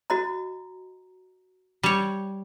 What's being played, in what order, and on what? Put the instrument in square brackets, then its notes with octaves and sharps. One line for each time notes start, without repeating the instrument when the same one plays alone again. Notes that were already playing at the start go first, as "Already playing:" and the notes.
[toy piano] F#4 D#5 A#5
[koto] G3 C#5